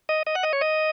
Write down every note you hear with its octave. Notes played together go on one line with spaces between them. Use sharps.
D#5
D#5
F#5
D#5
C#5
D#5